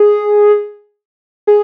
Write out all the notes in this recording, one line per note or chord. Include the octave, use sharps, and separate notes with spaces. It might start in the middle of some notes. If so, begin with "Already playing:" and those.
Already playing: G#4
G#4